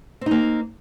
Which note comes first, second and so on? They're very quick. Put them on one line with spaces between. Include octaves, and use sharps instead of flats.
C4 D#4 A#3